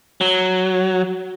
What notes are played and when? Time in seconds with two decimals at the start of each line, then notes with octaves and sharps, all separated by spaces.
0.21 F#3